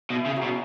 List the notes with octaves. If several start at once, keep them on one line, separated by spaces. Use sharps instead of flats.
B2
E4
C#3 G#4
F#3 F#4
B2